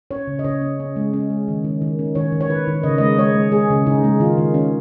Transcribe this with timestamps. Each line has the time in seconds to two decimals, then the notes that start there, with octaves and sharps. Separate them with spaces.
0.11 C#4 C#5
0.27 C#3
0.39 D#5
0.44 C#3 C#5
0.62 C#4
0.80 C#4
0.96 G#3
1.14 C#4
1.30 G#3
1.48 D#3
1.64 D#3
1.82 D#3
1.99 C#4
2.15 D#3 C#5
2.32 D#3
2.41 C#5
2.49 D#3 B4
2.67 D#3
2.84 C#3 D#5
2.98 G#3 D#5
3.18 G#3 C#5
3.35 G#3
3.52 G#3 G#4
3.70 C#3
3.87 C#3 D#4
4.04 G#3
4.20 D#3 F4
4.38 D#3
4.54 D#3 C#4